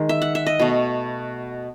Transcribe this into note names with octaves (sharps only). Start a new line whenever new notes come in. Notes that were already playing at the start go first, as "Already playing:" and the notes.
Already playing: D#3 G#3
E5
F#5
E5
D#5
B2 A3